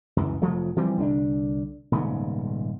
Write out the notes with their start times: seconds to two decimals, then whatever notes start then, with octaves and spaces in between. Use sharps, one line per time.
0.17 C#2 F#2 E3
0.42 F1 F3 F#3 A3
0.76 E3 F3 G3 C4
0.97 C2 D3 C4 D4
1.92 D#1 G#2 C#3 B3